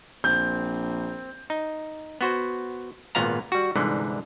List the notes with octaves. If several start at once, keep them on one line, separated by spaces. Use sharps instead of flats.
A#1 C4 G6
D#4
B3 F#4 C5
G#1 A#2 B3 F5 A#5
G3 F#4
C2 G#2 D3 E3